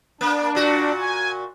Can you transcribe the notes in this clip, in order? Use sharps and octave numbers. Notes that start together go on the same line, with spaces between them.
A#3 D4
A#2 F#4
G#5